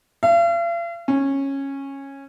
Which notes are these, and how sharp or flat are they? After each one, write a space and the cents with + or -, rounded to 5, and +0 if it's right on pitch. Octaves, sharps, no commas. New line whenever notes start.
F5 -45
C#4 -15